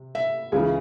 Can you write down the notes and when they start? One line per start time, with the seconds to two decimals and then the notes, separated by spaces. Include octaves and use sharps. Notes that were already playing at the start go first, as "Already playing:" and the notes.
Already playing: C3
0.15 E5
0.52 C#2 C#3 E3 G#4